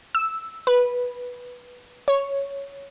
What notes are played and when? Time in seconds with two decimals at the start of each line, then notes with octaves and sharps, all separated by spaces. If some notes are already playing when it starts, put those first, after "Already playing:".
0.15 E6
0.67 B4
2.08 C#5